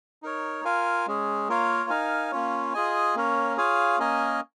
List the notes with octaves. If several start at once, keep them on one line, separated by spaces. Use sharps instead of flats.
D#4 A#4 C#5
F4 A#4 F5 G#5
G#3 C#4 G#4
A#3 F4 A#4 C#5 F5
D#4 A#4 F5 G#5
A#3 C#4 F4 C#5
F4 G#4 D#5 G#5
A#3 C#4 A#4 C#5
F4 G#4 C#5 F5 G#5
A#3 C#4 A#4 D#5 G#5